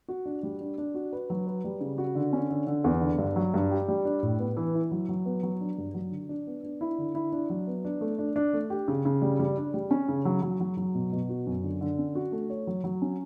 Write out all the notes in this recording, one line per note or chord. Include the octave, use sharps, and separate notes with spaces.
F#4
D4
G3
D4
D4
F#4
B4
F#3
B4
G3
C#3
F#4
D3
C#4
D3
D3
E2
D3
G2
F#3
G2
G4
G3
D4
A2
B3
E3
E4
F#3
F#3
B3
F#3
D4
G2
F#3
D3
D4
B3
D4
E4
D3
E4
D4
F#3
B3
D4
A3
D4
D4
A3
G4
C#3
C#3
G3
G3
D4
G3
C#4
C#3
F#3
F#3
F#3
F#3
B2
B2
F#4
F#2
D3
D3
C#4
F#4
A3
C#5
F#3
F#3
C#4